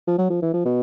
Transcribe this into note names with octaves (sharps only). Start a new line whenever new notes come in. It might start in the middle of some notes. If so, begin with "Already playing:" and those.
F3
F#3
F3
E3
F3
B2